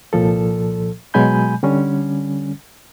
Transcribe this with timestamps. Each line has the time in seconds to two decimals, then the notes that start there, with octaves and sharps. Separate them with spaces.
0.13 C2 A#2 F3 A4
1.14 B2 F#3 G#3 G#5 B5 G6
1.63 D3 G3 C#4